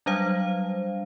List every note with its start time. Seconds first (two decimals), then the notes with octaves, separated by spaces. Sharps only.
0.06 F#3 G3 D4 C5 F5